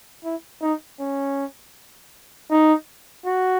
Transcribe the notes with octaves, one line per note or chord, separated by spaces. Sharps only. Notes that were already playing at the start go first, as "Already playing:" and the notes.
E4
D#4
C#4
D#4
F#4